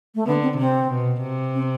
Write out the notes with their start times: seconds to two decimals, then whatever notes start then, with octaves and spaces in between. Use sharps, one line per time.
0.15 A3
0.26 D3 B3
0.43 C4
0.58 C3 C4
0.91 B2
1.22 C3
1.55 C4